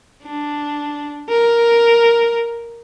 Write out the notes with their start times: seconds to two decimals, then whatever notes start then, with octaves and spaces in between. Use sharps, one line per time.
0.23 D4
1.29 A#4